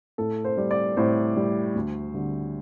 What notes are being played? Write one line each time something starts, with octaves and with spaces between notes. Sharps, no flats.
A2 A4
C5
G3
D5
A2 C5
G3
D2
D3 G3